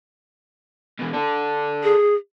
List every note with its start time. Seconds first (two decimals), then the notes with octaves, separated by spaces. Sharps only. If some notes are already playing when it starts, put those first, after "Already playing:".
0.99 B2 E3
1.13 A4 D5
1.84 G#4